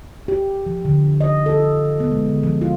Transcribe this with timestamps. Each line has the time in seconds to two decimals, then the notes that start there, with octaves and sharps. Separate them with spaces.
0.28 G4
0.66 F3
0.85 D3
1.21 D#5
1.46 A4
1.59 F4
2.00 B3
2.11 G#3
2.29 D3
2.43 F3
2.61 F4